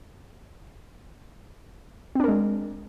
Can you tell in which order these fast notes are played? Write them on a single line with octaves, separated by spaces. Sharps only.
C4 D4 A#4 G#3